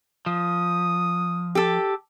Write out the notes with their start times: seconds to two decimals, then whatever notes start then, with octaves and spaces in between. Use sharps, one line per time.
0.26 F3 D#6
1.55 G4 A4